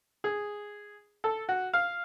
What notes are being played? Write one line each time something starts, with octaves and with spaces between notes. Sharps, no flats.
G#4
A4
F#4
F5